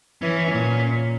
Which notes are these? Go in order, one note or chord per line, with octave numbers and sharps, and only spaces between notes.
E3 C#4
A#2